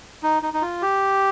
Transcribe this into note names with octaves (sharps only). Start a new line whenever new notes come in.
D#4
D#4
D#4
F4
G4